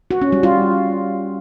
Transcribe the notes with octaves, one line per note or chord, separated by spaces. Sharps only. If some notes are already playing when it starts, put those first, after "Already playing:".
F#4
C#4
G3
F4